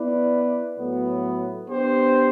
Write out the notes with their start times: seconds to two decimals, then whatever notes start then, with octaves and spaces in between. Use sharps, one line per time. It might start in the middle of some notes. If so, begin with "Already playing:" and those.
Already playing: B3 E4 B4 D5
0.77 A2 F#3 B3
1.67 B3 D4 G4 C5